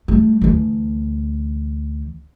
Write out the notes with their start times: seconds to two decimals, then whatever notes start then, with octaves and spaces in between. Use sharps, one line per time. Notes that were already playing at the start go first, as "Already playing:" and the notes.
0.08 G3 A3
0.42 D2 E3